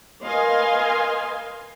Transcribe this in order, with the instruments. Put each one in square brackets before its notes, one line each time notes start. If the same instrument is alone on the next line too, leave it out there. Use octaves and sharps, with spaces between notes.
[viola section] A#4 B4 D#5 F5 G#5 C6